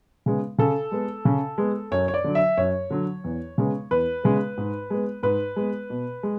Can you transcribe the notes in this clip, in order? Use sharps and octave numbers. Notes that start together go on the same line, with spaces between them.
C#3 G#3 B3
C#3 A4
G#3 B3
C#3
G#3 B3
F#2 C#5
C#5
D5
D3 F#3
E5
F#2 C#5
D3 F#3
E2
C#3 G#3 B3
E2 B4
C#3 G#3 B3
G#2
G#3 B3
G#2 B4
G#3 B3
B2
G#3